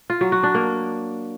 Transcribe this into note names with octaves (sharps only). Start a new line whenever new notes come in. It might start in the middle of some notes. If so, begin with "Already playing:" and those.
F4
F#3
F#4
D4
A#3